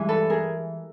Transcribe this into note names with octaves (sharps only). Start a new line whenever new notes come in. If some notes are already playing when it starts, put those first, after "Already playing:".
Already playing: G2 E3 G#3
A4 B4
G#4 A#4